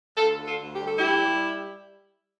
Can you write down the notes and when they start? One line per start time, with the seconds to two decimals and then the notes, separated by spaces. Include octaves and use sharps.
0.17 D2 F4 A4
0.38 D3
0.46 F4 A4
0.61 D2
0.75 G4
0.82 G3 A4
0.98 E4 G4
1.03 A#2
1.25 G3